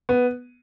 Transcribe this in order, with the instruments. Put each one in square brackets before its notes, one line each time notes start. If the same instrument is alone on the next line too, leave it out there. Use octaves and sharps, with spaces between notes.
[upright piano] B3